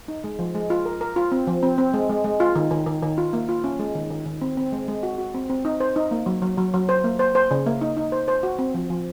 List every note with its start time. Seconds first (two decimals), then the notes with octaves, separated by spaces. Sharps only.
0.08 D#4
0.24 G#3
0.39 F3
0.55 G#3
0.70 F4
0.86 A#4
1.01 A#4
1.16 F4
1.32 C4
1.47 F3
1.63 C4
1.78 C4
1.94 G#3
2.09 G#3
2.24 G#3
2.40 F4
2.56 D#3
2.71 D#3
2.86 D#3
3.03 D#3
3.18 F4
3.33 A#3
3.49 F4
3.64 C#4
3.79 G#3
3.95 D#3
4.10 D#3
4.26 D#3
4.41 C4
4.57 C4
4.72 G#3
4.88 G#3
5.03 F#4
5.18 F#4
5.34 C4
5.50 C4
5.65 D#4
5.80 C5
5.96 D#4
6.11 A#3
6.26 F#3
6.42 F#3
6.58 F#3
6.74 F#3
6.89 C5
7.04 A#3
7.19 C5
7.35 C5
7.51 C#3
7.66 A#3
7.81 D#4
7.97 D#4
8.12 C5
8.28 C5
8.43 F#4
8.59 C4
8.74 F3
8.90 F3